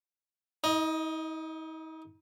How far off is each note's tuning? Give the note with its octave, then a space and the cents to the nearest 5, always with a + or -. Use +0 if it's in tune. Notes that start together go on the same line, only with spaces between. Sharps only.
D#4 +45 D#5 +0